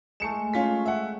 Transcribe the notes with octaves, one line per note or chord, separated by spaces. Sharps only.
G#3 A3 C#7 E7
C#4 F4 B6
E5 F#5